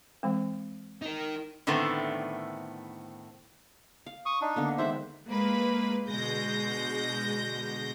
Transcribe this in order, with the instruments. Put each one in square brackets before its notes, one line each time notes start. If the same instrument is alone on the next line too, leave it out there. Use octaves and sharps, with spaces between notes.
[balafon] E3 G#3 C4
[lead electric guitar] D#4 A#4
[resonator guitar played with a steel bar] A2 D3 D#3 A3 B3 C4
[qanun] F5
[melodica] C#6 D#6
D4 D#4
[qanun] D3 A#3 B3
[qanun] D#3 G#3 B5 [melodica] C5 E5
[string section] G#3 A#3 B4
B2 D3 G#3 G6 A#6